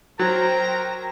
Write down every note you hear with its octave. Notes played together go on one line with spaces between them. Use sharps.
F#3 A#4 C5 G5 A#5